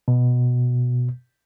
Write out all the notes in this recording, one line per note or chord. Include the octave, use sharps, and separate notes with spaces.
B2